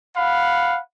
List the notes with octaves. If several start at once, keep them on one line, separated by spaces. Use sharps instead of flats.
F5 F#5 B5